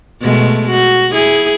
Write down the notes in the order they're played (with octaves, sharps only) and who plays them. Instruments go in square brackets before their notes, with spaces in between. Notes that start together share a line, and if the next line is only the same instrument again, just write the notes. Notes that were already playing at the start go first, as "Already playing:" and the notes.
[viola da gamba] B2 G#3 A3
F#4
E4 G#4